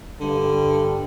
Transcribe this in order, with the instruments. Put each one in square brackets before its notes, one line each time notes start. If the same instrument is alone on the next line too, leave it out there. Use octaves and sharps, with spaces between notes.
[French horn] G2 [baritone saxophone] D3